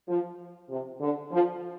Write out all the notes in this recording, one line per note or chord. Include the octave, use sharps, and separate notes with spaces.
F3
C3
D3
F3